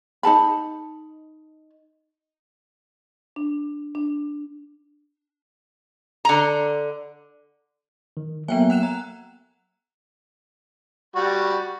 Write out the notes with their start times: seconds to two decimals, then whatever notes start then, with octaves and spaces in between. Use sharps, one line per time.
0.23 D#4 A4 A5 B5
3.36 D4
3.95 D4
6.25 D3 A#5
8.17 D#3
8.48 F#3 A#3 B3 E5 G5 G#5
8.70 F#5 F#6 E7
8.83 A#5
11.16 G3 F#4